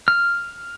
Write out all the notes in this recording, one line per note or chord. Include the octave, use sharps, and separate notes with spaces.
F6